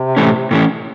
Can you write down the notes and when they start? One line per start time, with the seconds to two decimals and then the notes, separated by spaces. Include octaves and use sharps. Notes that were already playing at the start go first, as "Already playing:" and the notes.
Already playing: C3
0.17 A2 E3 A3 C#4
0.51 A2 E3 A3 C#4